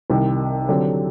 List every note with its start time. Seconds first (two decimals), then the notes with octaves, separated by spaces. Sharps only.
0.10 C2 C3 D#3
0.68 D3 F#3 C4 G4